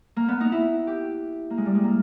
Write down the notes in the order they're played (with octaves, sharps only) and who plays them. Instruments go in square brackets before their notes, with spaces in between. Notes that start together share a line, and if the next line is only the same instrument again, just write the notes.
[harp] A#3
B3
D#4
E4
G4
A#3
G#3
G3
G#3
A#3